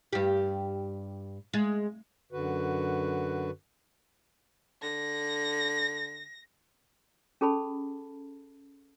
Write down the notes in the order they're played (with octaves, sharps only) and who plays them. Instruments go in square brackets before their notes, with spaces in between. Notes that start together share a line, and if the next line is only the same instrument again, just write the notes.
[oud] G2 G4
G#3
[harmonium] F#2 D3 F#4 B4
[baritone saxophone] D3 [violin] A#6
[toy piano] C#4 G#4 A4 A5 B5